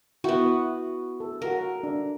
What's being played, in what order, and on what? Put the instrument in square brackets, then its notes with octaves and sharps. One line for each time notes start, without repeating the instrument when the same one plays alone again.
[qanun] B3 F#4 [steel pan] E4 G5 B5
[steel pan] D#6
A4
[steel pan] F#4 F5 [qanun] A#4
[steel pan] D4 A4